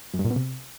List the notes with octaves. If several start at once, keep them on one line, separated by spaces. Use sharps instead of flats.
F#2
G2
A#2
B2
C3